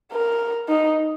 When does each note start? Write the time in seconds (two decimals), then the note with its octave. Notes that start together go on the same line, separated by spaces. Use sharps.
0.12 A#4
0.69 D#4